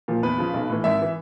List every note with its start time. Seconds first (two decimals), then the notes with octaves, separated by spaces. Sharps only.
0.08 A#2 F3
0.23 E2 B4
0.38 C#3 F3
0.54 B1
0.70 A2 E3
0.84 G#1 E5
1.02 E3